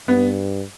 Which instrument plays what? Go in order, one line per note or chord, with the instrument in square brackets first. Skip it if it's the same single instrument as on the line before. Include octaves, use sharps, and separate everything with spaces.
[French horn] G2 [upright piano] B3